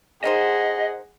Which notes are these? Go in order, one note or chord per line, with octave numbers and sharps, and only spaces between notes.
D#3 D#4 G#4 C5 D#5 F#5